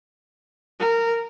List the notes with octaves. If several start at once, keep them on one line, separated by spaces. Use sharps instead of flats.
A#4